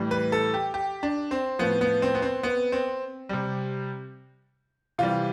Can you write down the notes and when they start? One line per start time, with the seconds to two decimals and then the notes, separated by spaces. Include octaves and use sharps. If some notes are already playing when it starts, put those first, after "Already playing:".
Already playing: A2 E3 G3
0.11 B4
0.32 A4
0.54 G4
0.74 G4
1.03 D4
1.31 C4
1.59 A2 F3 B3
1.81 B3
2.02 C4
2.15 B3
2.22 C4
2.43 B3
2.72 C4
3.29 C3 G3
4.98 C3 E3 G3 F4